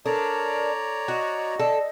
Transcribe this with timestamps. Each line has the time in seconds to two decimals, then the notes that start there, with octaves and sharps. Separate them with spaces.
0.06 D4 A4 A#4 C#5 D5 A#5
1.08 F#4 D#5
1.60 A4 D5